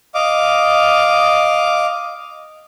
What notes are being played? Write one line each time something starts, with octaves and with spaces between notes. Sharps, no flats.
D#5 F5 D6